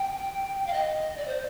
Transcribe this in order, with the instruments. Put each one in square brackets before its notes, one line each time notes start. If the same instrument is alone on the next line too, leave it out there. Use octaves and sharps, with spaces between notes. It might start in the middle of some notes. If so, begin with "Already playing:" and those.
Already playing: [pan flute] G5
F5
D#5
D5
C5